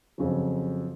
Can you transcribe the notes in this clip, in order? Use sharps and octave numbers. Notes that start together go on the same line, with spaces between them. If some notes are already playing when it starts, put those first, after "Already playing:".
F2 C#3 F#3